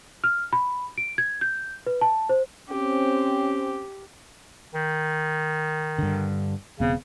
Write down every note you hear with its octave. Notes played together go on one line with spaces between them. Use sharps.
F6
B5
D7
G#6
G6
B4
A5
C5
C4 C#4 G4
D#3
G2 D3
E1 C#3 B3 C4